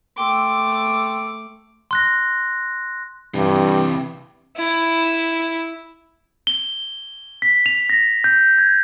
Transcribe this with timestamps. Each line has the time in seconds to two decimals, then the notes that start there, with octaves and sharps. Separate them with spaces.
0.18 A3 G5 C6 D6 E6
1.91 C6 F#6 A#6
3.34 G2 C3 E3
4.57 E4
6.47 G7
7.42 B6
7.66 F7
7.90 A#6
8.24 G6
8.58 G#6